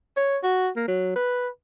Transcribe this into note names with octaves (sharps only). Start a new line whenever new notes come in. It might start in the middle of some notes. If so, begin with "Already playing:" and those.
C#5
F#4
A#3
F#3
B4